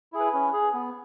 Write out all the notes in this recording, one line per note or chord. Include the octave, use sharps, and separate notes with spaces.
E4 G#4
B4
C#4
G#4
B3